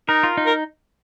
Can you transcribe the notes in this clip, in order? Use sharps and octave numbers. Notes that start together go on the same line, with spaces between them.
D#4 A#4
F4
D#4
A#4